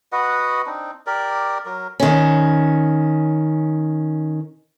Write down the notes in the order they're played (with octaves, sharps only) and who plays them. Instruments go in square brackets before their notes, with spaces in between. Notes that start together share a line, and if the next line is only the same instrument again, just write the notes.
[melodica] F#4 B4 D#5 F#5
C4 D4 D#4
G4 A#4 D5
F#3 A#4
[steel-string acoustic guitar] D#3 C#4